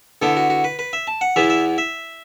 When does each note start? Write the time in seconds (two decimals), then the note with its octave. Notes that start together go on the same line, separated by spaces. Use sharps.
0.22 D3 B3 E4 A4
0.37 F#4
0.50 F#4
0.64 B4
0.79 B4
0.93 E5
1.07 A5
1.21 F#5
1.36 E2 E3 B3 E4 E5
1.50 E5
1.78 E5